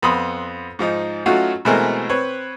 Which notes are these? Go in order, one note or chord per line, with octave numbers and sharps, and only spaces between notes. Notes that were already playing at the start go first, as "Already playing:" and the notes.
F2 B3 B5 C6 D#6
G#2 F3 D#4
F#3 A3 C#4 D#4 F4 F#4
B2 E3 G#3 A3 C4 A#4
C4 B4 C#5